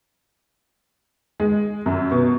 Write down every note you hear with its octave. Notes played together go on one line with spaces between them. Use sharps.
G#3
F#2
B2